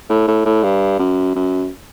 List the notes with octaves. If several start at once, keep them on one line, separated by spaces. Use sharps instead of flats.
A2
A2
A2
G2
F#2
F#2